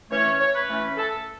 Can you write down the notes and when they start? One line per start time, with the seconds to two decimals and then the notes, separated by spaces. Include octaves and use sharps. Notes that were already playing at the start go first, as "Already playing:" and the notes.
0.11 E3 A3 C#4 C#5
0.40 C#5
0.54 B4
0.68 E3 A3 C#4
0.97 A4